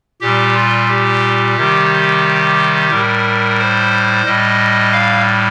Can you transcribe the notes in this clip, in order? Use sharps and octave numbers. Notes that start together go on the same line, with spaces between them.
A#2 G3 G4
F4
G4
C3 D#3 G3
A2 G3 A#4
C5
A2 G3 D#5
F5